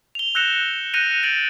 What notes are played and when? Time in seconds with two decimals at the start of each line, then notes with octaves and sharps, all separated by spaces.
0.15 F7 G7
0.35 E6 F#6 G6 A#6 C#7 E7
0.94 F#6 G6 A#6 C#7 D#7 F7
1.23 G6 A6 D7 D#7 F#7